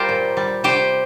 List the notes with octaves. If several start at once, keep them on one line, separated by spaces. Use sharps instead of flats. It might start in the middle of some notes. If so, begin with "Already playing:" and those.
Already playing: G3 F4 G4 A#4 C5
A#2
G3
C3 G4 C5